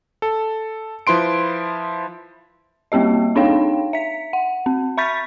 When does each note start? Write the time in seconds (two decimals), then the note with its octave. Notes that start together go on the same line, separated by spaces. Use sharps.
0.22 A4
1.07 F3 E4 B4 C6 D7
2.92 G3 A#3 C4 G4 D#5
3.35 C4 D4 D#4 C#5 F5 G5
3.93 E5 B6
4.33 F#5
4.66 C4
4.97 E5 B5 C#6 G6 A6 B6